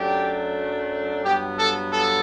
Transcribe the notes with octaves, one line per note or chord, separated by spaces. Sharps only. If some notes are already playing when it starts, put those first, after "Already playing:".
Already playing: F#2 F#3 A3 D4 G4
G2 F#3 B3 G4
A4
A4